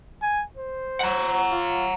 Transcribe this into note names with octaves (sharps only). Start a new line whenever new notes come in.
G#5
C5
F#5 A#5
F4